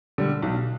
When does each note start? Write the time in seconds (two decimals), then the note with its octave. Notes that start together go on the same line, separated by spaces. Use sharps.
0.18 D3 G3
0.42 B1